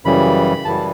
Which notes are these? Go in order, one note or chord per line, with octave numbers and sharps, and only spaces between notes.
F#2 C#3 E3 G3 B5
F#2 C#3 E3 G3 A5